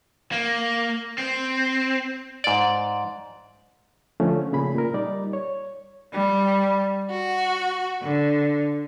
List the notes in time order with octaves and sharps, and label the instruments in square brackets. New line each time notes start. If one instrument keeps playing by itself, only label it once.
[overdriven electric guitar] A#3
C4
[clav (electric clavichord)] G#2 D5
[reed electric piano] D3 F3 A3 C#4
A#2 C#3 G#4 B5
A#2 A#4
G3 D#4 D5
C#5
[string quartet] G3
F#4
D3